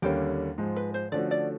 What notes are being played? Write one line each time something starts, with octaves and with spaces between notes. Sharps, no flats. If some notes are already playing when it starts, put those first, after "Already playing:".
D#2 D3 G3 A#3 C#4 G4
G#2 F3 G#3
B4
C5
D3 F3 A3 C#4 F#4 D5
D5